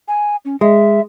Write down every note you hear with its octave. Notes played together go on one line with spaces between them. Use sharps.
G#5
C#4
G#3 E5